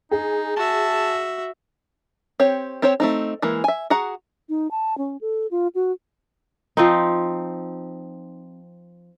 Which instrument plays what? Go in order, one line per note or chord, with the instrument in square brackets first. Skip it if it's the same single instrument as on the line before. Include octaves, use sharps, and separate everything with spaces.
[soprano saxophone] D#4 [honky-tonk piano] G#4
[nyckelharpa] F#4 E5 [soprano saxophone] A5
[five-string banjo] C4 G4 C#5
C4 G4 C5 C#5 G5
A3 C4 D#4
E3 G#3 A#3
E5 G#5
F#4 G#4 F#5 A#5
[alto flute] D#4
A5
C#4
A4
F4
F#4
[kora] F3 C4 D#4